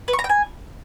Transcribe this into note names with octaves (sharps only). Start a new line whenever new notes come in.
B4
C#6
A#5
G5
G#5